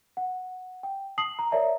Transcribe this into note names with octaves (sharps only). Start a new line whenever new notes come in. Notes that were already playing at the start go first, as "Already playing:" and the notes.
F#5
G5
A5 D#6 C7 F#7
A#5
A#4 C#5 D5 E5 A5 A#5